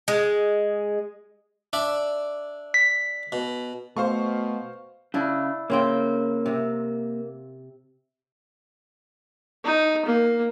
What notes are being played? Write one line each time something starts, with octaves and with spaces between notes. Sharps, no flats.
G#3
D4 D5 E5
B6
B2
B2 A3 C5 F5 C#6
C#3 D4 E4
C#3 A#3 C4 G5
C3
D#4
A#3